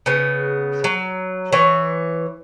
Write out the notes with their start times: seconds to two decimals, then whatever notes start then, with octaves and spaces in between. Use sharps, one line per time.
0.06 C#3 B3
0.84 F#3
1.53 E3 C#5